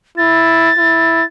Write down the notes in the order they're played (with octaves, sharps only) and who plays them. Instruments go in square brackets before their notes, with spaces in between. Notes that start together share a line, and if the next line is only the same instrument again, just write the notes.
[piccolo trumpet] E4 [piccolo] A6
[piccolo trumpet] E4